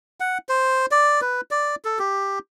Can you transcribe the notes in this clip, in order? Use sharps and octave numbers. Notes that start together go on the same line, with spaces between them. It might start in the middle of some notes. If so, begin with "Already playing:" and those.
F#5
C5
D5
B4
D5
A4
G4